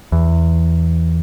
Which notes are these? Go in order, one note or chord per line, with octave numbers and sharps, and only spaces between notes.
E2